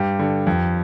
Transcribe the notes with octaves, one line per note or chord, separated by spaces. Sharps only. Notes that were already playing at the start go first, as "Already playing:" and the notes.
Already playing: G2 G4
D3
F2